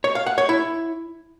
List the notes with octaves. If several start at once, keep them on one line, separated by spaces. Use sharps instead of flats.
C#5
F5
F#5
C#5
E4